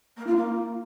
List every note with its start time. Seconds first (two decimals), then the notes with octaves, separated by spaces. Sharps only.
0.17 A#3
0.26 F4
0.36 A#3